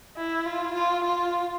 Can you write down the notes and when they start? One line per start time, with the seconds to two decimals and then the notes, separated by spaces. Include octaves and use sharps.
0.17 E4
0.46 F4
0.74 F4
1.04 F4